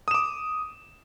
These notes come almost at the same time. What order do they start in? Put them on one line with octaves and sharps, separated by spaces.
D#6 E7 D6